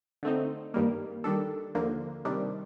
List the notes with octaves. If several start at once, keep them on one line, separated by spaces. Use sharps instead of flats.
D3 A3 C4 D#4
G2 D#3 G3 A#3
D#3 G3 D4 A4
D#2 D3 F3 A#3
C3 D#3 G3 D4